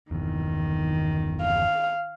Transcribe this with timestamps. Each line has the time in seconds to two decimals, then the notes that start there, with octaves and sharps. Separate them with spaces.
0.11 G1 E2 D#3
1.41 F5